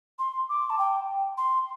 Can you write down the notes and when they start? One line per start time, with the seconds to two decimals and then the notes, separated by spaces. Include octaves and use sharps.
0.19 C6
0.49 D6
0.70 A5
0.79 G5
1.38 C6